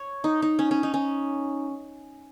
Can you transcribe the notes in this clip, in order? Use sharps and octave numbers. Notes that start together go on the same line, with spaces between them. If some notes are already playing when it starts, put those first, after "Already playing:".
Already playing: C#5
D#4
D#4
C#4
C#4
D#4
C#4